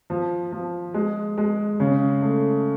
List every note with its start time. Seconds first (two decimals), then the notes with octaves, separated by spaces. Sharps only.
0.10 F3
0.52 F3
0.94 G#3
1.38 G#3
1.80 C#3
2.22 A3